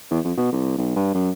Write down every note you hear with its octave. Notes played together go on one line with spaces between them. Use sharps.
E2
F2
B2
C2
B1
G2
F#2